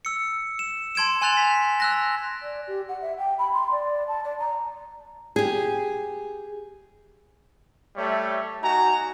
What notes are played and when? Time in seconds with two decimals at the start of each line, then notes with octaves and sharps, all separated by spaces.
0.05 E6 C#7
0.59 E7
0.95 A5 C6 G#6 D7 E7
1.22 G#5 C6 F#6 A6 F7
1.37 B6
1.80 E6 F#6 A#6
2.42 D5
2.67 G4
2.88 F#5
3.01 E5
3.18 G5
3.39 B5
3.53 C6
3.71 D5
4.08 A5
4.24 D5
4.40 A#5
5.36 G4 G#4
7.95 G3 A3 C#5 E5
8.62 D#4 F#4 G#5 A#5